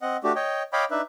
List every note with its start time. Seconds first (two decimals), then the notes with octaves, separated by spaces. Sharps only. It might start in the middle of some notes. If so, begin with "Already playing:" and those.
0.02 C4 D#5 F#5
0.24 A3 D4 F#4 G4
0.36 C#5 D#5 G5
0.73 C#5 D#5 F5 G5 B5 D6
0.91 D4 D#4 B4 E5